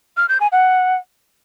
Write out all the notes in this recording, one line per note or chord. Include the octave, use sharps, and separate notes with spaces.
F6
G6
G#5
F#5